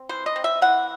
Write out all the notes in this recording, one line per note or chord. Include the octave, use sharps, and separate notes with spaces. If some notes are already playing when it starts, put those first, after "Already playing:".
Already playing: C4
E3 C5
D#5
C4
E5
E3 F#5